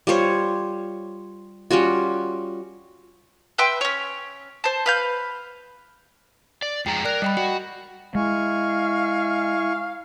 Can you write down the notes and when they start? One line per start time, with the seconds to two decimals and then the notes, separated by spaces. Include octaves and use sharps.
0.07 G3 F4 C5 C#5
1.71 G3 C#4 F4 F#4
3.58 B4 E5 G5 C6
3.81 C#4 C#5
4.64 C5 A5
4.86 B4 F5 G6
6.62 D5
6.86 F2 G#3 G5 A#5
7.05 A#4 D5 F#6
7.22 G3 D#5 G5 B5
7.37 F#4 F#5 G5
8.15 G#3 E4 F5 G#5 C#6